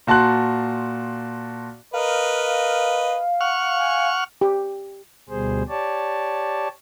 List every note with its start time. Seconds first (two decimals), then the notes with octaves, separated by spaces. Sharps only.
0.07 A#2 F#4 A5 C6 F#6
1.93 A#4 B4 D#5 F5
3.41 F#5 C#6 F6
3.78 G#5
4.41 G4
5.29 D2 B2 G3 G#4 C5
5.69 G4 C#5 D5 A5